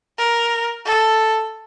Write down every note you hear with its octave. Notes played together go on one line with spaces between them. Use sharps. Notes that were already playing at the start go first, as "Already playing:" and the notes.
A#4
A4